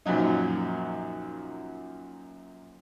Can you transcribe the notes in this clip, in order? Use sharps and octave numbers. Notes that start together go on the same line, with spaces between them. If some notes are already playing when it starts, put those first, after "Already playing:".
F#2 A#2 F3 F#3 D#4